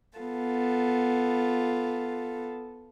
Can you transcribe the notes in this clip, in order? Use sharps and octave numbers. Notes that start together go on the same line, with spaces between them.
B3 F4 A4